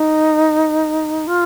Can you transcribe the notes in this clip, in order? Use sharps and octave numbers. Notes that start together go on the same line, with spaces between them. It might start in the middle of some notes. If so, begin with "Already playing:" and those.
Already playing: D#4
F4